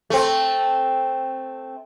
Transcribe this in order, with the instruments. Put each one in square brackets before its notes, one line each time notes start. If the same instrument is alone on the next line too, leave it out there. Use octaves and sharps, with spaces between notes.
[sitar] A3 C4